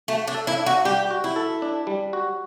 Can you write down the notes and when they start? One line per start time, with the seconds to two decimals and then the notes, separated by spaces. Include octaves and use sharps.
0.08 A3 F#4
0.27 D4
0.35 A4
0.47 E4
0.60 D4
0.66 F#4
0.85 G3 G4
1.10 F#4
1.24 E4
1.36 A4
1.62 D4
1.87 G3
2.13 F#4